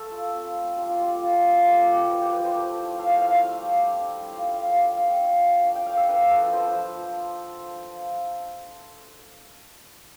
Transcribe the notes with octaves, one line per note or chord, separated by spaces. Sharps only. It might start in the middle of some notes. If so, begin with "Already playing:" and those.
Already playing: A3 A4
F4
C4
A3
G3 F4
F4
F4 G4
A4
F4
A4
C4 C5
A4
F3 G4
G4
C4 G4
G4
F3 B4
G4
F3 B4
C5
A3
E4
A3 F5
F5
E4 F5
F5
G3
G3
D4
G3
F4 F5
E5
G3 F5
F5
G3
G5
F4 F5
G5
A3
A3
D4 F5
G5
A3 F5
E5
D4 B4
F3 A4
B4
B3 C5
F3